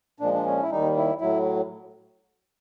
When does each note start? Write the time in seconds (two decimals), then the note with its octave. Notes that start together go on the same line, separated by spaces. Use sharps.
0.20 A#2 F3 G#3 D4
0.34 D4
0.46 C#4
0.63 E4
0.71 D#2 D#3 G3 D#4
0.96 E4
1.21 A2 F#3 E4